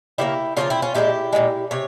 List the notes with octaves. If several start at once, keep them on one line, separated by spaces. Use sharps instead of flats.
C#3 F3 A#3 E4 G4
C#3 F3 A#3 C#4 F4
C4 E4
C#4 F4
A#2 F3 G#3 E4 G4
A#2 F3 G#3
C3 C#5